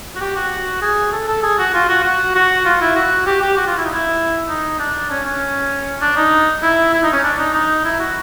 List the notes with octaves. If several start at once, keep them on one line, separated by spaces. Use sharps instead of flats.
F#4
G4
F#4
G#4
A4
A4
G#4
F#4
F4
F#4
F#4
F#4
F4
E4
F#4
G4
G4
F#4
F4
E4
D#4
E4
D#4
D4
C#4
C#4
D4
D#4
E4
E4
D#4
C#4
D4
D#4
D#4
E4
F#4